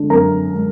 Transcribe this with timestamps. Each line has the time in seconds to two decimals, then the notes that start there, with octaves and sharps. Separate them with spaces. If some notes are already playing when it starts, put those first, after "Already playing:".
Already playing: D3 G#3 D4
0.10 F#2 A#4 A#5
0.51 D3 G#3 D4